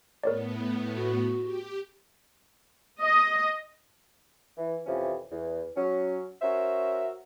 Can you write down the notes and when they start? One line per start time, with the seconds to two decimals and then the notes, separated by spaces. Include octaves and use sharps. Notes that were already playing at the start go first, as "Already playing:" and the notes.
0.24 A2 B3 A#4 C#5 D5
0.95 F#4
1.42 G4
3.01 D#5
4.57 E3
4.86 F2 C3 E3 F3 C#4
5.31 E2
5.76 F#3 C#4
6.42 C#4 F#4 A#4 C5 E5